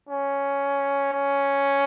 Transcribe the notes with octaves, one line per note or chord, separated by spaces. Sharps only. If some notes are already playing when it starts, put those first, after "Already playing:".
C#4
C#4